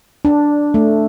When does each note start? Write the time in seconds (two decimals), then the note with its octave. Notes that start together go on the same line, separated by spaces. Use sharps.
0.25 D4
0.74 A3